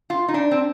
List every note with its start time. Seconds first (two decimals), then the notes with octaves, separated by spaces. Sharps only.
0.10 F4
0.28 D#4
0.34 D4
0.51 C4